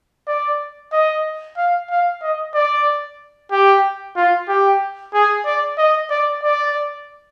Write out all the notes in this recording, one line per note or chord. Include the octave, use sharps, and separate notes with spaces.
D5
D#5
F5
F5
D#5
D5
G4
F4
G4
G#4
D5
D#5
D5
D5